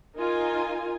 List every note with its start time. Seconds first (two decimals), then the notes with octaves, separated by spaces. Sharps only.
0.18 D#4 F4 A#4 G#5